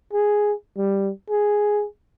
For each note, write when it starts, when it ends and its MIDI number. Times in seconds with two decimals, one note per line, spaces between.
0.13 0.52 68
0.78 1.10 55
1.30 1.85 68